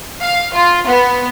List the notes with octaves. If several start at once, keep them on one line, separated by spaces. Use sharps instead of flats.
F5
F4
B3